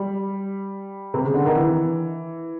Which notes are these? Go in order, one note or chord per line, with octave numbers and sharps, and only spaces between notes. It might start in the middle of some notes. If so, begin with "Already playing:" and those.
Already playing: G3
C3
C#3
D3
D#3
E3